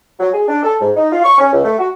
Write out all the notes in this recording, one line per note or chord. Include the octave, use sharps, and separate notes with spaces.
F#3
G#4
D4
A4
G#2
D#4
F4
C#6
C#4
C#2
A3
F#4